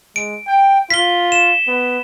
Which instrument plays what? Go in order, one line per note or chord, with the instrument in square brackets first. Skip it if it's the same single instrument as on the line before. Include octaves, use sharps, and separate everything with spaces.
[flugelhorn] G#3 [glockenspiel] D7
[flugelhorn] G5
[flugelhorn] F4 [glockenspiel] B6 G7
[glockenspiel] E7
[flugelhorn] B3